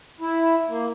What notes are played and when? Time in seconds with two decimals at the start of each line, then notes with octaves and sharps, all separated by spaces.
0.20 E4
0.69 A#3